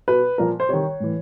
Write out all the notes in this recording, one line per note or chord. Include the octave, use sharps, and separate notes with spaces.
B2 B4
A#2 F3 A#4
C5
C3 D#3 C#5
A2 E3